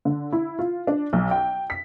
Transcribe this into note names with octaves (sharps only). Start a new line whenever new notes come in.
D3
E4
F4
D4
B1
G5
B6